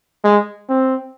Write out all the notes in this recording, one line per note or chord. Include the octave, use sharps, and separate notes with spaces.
G#3
C4